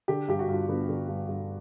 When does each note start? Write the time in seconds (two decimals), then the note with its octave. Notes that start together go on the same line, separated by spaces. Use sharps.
0.08 D3 G4
0.28 G2 G4
0.39 F#4
0.49 G2 F4
0.68 D3 B3
0.89 D3
1.08 G2
1.28 G2